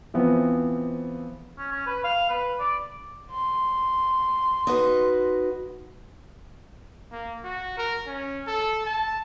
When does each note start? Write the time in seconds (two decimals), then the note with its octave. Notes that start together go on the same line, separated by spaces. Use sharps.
0.14 E3 F3 B3 C4
1.58 C#4
1.72 C#4
1.86 B4
2.04 F5
2.30 B4
2.60 D5
3.31 C6
4.67 D#4 F#4 B4
7.12 A#3
7.44 F#4
7.78 A#4
8.07 C#4
8.48 A4
8.86 A5